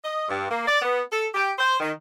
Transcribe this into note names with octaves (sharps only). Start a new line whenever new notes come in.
D#5
G2
A#3
D5
B3
A4
G4
C5
D#3